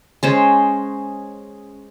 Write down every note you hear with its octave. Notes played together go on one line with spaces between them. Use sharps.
G#3 C#4 C5